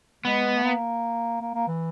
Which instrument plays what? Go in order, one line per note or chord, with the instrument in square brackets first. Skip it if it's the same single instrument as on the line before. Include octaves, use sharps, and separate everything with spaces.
[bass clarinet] G#3 [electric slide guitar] B3
[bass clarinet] A3
A#3
A#3
A#3
E3